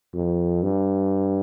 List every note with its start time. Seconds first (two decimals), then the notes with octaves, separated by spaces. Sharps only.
0.14 F2
0.63 G2